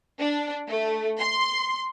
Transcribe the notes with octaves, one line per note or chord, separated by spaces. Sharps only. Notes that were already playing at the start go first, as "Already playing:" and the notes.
D4
A3
C6